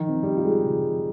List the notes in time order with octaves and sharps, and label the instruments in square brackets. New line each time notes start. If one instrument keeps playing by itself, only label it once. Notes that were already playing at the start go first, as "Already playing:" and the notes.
Already playing: [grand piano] D#3 [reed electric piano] F3
[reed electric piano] C4
[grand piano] G3
[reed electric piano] F4
[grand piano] G#3
[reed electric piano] C#3
F3